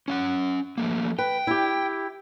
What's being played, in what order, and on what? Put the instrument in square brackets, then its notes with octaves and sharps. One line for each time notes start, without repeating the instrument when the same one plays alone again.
[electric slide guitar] C#4 F5 F#5
F3 A3 A#3
[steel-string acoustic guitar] B4 [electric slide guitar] G5
[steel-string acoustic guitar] E4 G4